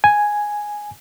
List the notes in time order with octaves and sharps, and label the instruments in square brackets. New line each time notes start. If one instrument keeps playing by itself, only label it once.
[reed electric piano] G#5